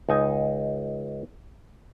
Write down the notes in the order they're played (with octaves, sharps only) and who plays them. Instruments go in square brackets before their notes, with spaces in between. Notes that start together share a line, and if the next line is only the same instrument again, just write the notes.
[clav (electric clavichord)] C#2 D#4 G#5